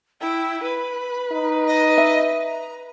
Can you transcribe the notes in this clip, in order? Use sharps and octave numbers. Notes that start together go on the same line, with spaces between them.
E4 G5
B4 B5
D#4
D#5
E5
A#5